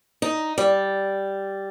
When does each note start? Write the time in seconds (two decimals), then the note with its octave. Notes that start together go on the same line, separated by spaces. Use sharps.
0.22 D#4
0.58 G3